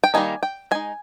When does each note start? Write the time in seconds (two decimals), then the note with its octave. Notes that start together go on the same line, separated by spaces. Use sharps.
0.04 G5
0.14 D#3 G3 A#3 D#4 G#5
0.43 G5
0.71 G#3 D#4 G#5